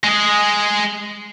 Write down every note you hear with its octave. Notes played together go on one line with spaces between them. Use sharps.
G#3 G#4